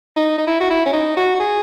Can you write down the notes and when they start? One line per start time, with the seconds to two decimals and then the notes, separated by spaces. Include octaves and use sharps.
0.16 D#4
0.38 D#4
0.47 E4
0.61 F#4
0.70 E4
0.86 C#4
0.93 D#4
1.17 F#4
1.35 F#4
1.40 G#4